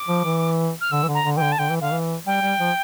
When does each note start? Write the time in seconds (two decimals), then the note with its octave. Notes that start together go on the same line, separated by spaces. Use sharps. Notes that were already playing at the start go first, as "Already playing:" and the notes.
Already playing: D6
0.08 F3
0.25 E3
0.81 F6
0.92 D3 E6
1.03 E3
1.08 D3
1.14 A#5
1.25 D3
1.36 E3 G5
1.42 D3
1.52 A5
1.59 D3 G5
1.70 E3
1.81 D3 F5
1.92 E3
2.26 G3 G5
2.42 G3
2.59 F3